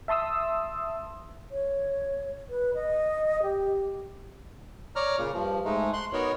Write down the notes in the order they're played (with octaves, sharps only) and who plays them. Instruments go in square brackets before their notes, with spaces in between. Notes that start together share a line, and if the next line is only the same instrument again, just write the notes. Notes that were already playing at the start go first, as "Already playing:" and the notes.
[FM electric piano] E5 A5 C6 D#6 E6
[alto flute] C#5
B4
D#5
G4
[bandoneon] C#5 D5 A#5 F6
A#2 C#3
G2 F3
G#2 G#3 A3 D#4
C6 F#6
B3 D#4 F#4 A#4 C#5